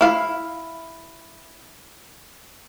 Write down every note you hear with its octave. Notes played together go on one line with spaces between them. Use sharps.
E4 F5